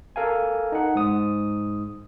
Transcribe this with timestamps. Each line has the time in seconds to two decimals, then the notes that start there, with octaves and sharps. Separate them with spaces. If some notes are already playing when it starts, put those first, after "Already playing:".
0.16 A4 A#4 F5 G#5
0.72 D#4 F#5
0.95 G#2 D#6